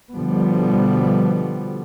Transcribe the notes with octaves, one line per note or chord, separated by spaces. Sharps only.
B2 D3 F3 G3 B3